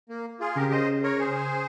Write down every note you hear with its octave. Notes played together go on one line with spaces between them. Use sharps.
A#3
F4 G#4
C#3 G4 A#4
C5 D#5
A#4 C#5
G#4 C5